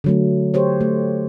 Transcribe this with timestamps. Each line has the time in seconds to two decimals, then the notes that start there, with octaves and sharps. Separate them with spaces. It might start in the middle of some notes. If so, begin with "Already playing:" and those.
0.04 D3 F#3 A3
0.54 G4 C5 C#5
0.81 A3